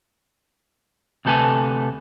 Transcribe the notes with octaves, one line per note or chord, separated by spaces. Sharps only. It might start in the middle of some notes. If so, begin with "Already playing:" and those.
D2 C3 A3 A4 B4 G#5